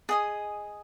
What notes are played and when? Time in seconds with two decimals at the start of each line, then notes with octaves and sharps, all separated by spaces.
0.09 G#4 D#5 G#5